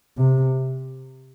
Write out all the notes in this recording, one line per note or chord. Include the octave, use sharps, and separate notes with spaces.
C3